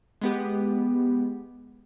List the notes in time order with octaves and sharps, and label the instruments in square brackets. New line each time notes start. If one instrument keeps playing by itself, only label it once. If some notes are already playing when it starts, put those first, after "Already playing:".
[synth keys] G#3 B3 G4